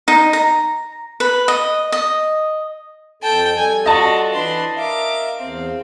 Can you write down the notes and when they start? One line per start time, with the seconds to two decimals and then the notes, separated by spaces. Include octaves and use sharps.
0.08 D#4
0.33 A#5
1.20 B4
1.48 D#5
1.92 D#5
3.23 F2 A4 G5 A5
3.56 G3 A4 G#5
3.86 F4 F#4 D#5 A5
4.33 E3 D4 B4 C6
4.77 A#4 E5 F5 D6
5.38 E2 C4 F5